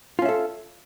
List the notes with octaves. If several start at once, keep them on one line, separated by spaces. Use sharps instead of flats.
C#4 F4 A4 E5